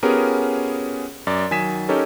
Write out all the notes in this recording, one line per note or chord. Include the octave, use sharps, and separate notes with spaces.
B3 C#4 F4 G4 G#4 A#4
F#2 D5 A6
D#3 F#3 G#5 D#6 B6 E7
C#4 D#4 G4 A4 A#4 C#5